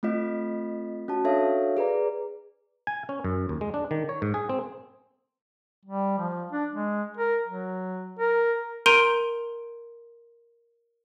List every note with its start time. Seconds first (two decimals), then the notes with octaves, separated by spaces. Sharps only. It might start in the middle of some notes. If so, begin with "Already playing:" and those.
0.03 A3 C4 F4 D#5 B6
1.08 C#4 F#4 A5
1.25 D4 F#4 A4 C#5 E5 F5
1.77 G#4 B4 D5 A#5
2.87 G#5
3.09 C#4
3.24 F#2
3.49 D#2
3.61 G#3
3.74 D4
3.91 D#3
4.09 C#5
4.22 G#2
4.34 G#4
4.49 C4
5.85 G3
6.18 F3
6.52 D4
6.72 G#3
7.17 A#4
7.47 F#3
8.19 A#4
8.86 A#4 A#5 C6 G6 D7 D#7